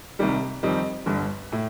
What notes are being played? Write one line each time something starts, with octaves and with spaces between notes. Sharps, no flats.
C2 C3 D#3 G3
F2 D#3 G3 C4 D#4
G1 G2 D3
A2